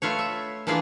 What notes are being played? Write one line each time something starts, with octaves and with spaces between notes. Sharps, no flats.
A3 F4 B4 C#5
E5
E3 A#3 D4 F4 G#4 B4